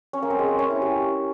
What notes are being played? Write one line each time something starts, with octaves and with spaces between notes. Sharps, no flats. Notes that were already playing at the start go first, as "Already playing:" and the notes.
C#4
A#3
C4
G#3
A#3
C#4
E4
G4